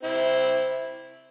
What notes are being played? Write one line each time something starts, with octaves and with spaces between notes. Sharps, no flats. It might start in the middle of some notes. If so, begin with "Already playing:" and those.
C4 E4